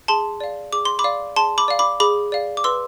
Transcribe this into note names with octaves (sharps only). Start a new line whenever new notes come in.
G#4 A5 C6
D5 F5
G#4 D6
C6
B5 D6
D5 F5
G#4 A5 C6
B5 D6
D5 F5
B5 D6
G#4 B5 D6
D5 F5
D6
B4 C6 E6